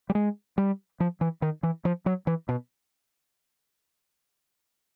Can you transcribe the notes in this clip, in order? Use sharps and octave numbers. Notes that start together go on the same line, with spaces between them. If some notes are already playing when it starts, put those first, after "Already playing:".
G3
G#3
G3
F3
E3
D#3
E3
F3
F#3
E3
B2